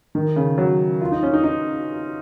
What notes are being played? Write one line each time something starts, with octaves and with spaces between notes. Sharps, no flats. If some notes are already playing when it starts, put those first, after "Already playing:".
D#3
C#3
F#3
F4
D#4
C#4
D#4
D#4